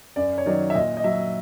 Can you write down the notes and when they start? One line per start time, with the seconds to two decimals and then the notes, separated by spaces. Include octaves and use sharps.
0.16 F#2 D5
0.38 C#5
0.46 D#3 F#3 D5
0.70 E5
0.75 A#2 D#5
0.97 D#5
1.04 F#3 E5